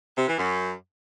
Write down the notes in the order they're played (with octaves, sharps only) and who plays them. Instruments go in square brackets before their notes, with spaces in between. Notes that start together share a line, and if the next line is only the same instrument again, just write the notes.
[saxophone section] C3
E3
F#2